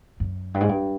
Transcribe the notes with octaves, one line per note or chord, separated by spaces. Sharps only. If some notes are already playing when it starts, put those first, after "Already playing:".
F#2
G2
G#2
G2